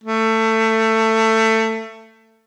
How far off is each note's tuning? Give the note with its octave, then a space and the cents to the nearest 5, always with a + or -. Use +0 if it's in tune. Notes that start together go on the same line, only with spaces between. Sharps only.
A3 +20